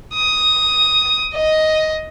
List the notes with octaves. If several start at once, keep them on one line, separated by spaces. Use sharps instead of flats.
D#6
D#5